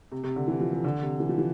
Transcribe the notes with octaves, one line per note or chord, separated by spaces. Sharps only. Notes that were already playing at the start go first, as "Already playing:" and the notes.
C3
C3
D3
E3
F3
E3
D3
C3
E3
F3
E3